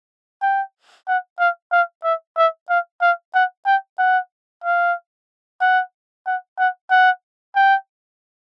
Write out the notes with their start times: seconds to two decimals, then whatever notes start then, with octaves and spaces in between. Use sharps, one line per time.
0.42 G5
1.08 F#5
1.39 F5
1.72 F5
2.04 E5
2.37 E5
2.69 F5
3.02 F5
3.34 F#5
3.66 G5
3.99 F#5
4.64 F5
5.61 F#5
6.26 F#5
6.58 F#5
6.91 F#5
7.55 G5